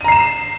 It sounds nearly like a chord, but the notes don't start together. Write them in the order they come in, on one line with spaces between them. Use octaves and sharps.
D#7 A#5 C7 E7